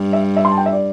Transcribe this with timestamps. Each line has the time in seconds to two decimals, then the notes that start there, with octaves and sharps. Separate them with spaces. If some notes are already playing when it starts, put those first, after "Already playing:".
Already playing: G2
0.13 E5
0.36 E5
0.45 C6
0.51 A5
0.58 G5
0.66 E5
0.72 D5